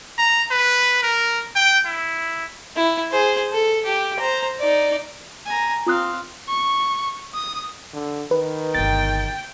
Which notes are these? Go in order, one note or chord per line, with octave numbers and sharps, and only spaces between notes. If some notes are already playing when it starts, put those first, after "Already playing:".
A#5
B4
A#4
G5
E4
E4
G#4 C5
A4
G4
C5 A#5
D#4 D5
G#5 A#5
C4 F4 F5 D#6 F#6
C#6
D#6
D3
D#3 B4
G1 B2 G5 A6